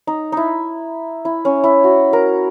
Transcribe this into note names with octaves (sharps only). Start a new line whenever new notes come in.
D#4
D#4 E4
E4
C#4
E4
F#4
A#4